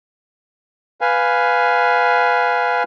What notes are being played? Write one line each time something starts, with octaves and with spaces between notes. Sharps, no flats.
B4 F5 G#5